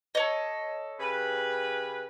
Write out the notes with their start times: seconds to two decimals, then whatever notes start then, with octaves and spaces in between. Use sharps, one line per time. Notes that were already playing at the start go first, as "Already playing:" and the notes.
0.15 A4 C#5 D#5
1.00 C#3 G4 B4